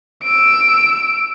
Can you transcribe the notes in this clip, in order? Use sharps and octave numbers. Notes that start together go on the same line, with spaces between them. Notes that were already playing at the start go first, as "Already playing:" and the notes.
E6 D7